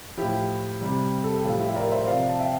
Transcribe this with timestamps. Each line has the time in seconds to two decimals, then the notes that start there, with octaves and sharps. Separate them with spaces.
0.17 A2 F3 E4 G4
0.81 C3 G3
1.24 A4
1.34 G4
1.45 A2 F3 F4
1.59 E4 G4
1.69 E5
1.76 A#4 D5
1.91 C5 E5
2.07 C3 F3 D5 F5
2.29 A5
2.40 E5 G5